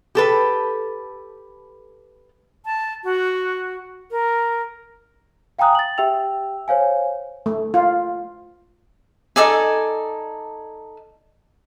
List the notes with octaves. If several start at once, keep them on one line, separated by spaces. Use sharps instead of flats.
G4 A4 B4
A5
F#4
A#4
F5 G5 G#5 A#5 D#6 F#6
A6 F#7
G4 E5 G5 E6 F7
C5 C#5 F5 G#5
A3
F4
D#4 A4 D5 G#5